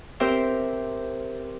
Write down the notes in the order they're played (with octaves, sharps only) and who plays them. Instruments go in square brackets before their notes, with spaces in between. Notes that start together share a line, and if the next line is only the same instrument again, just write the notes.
[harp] C4 G4 A#4 C5 E5 E6